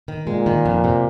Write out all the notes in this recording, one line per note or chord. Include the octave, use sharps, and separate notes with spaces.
D#3
A#2 G#3
D#3
F2
C3